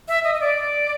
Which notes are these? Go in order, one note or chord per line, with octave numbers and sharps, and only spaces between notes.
E5
D#5
D#5
D5